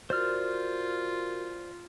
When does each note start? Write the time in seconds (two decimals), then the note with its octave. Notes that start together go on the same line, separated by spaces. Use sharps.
0.10 F4 F#4 A#4 C5 D5 F6